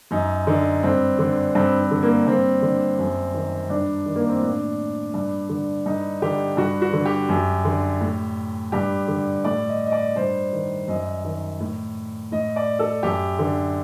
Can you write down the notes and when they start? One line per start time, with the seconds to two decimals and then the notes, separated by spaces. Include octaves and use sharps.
0.11 F#2 D#4
0.47 D3 D#4
0.83 G2 C4
1.19 D3
1.55 G2 C4
1.80 C4
1.91 D3
2.03 A#3
2.27 G2 C4
2.62 D3
2.99 F#2
3.34 D#3
3.70 G2 D4
4.06 D#3
4.16 A#3
4.29 C4
4.42 A2 D4
5.14 G2
5.49 D3
5.86 G2 D#4
6.22 D3 G4
6.57 G2 F#4
6.82 F#4
6.93 D3
7.05 G4
7.29 F#2
7.65 D3
8.00 A2
8.72 G2 G4
9.08 D3
9.44 A2 D5
9.69 D#5
9.86 D#5
9.92 D5
10.16 G2 C5
10.53 D#3
10.88 F#2 D#5
11.25 D#3
11.60 A2
12.32 A2 D#5
12.56 D5
12.79 A4
13.03 F#2 G4
13.39 D3